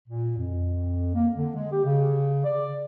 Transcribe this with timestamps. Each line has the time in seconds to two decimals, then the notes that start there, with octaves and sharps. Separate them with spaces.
0.08 A#2
0.37 F2
1.15 A#3
1.36 D3
1.55 G#3
1.72 G4
1.85 C#3
2.44 D5